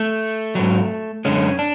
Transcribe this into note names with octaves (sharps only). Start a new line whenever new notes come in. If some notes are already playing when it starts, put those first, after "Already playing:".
Already playing: A3
G#2 F#3
F#2 D3 G#3 C#4
D4